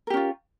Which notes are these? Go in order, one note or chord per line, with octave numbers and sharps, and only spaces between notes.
C#4 F4 G4 A#4